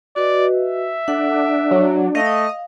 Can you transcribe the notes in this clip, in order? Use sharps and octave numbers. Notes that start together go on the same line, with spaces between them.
F#4 B4 D5 D#5
E5
D4 A4 F#5 D6
F#3
A3 D#5 F5